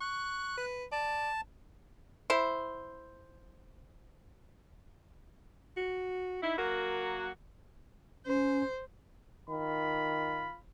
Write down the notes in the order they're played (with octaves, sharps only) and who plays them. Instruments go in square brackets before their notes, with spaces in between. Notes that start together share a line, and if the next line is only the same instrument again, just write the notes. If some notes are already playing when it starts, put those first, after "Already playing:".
[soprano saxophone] C#6 [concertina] F#6
[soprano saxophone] B4
[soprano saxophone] D5 [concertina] A5
[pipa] E4 C5
[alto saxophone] F#4
[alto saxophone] D#4 [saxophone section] E4
[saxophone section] F#3 A#3 F#4 [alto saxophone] A#4
[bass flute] C#4 [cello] C5
[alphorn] D#3 [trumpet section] F4 B5